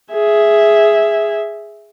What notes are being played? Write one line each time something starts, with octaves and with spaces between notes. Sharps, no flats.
G#4 E5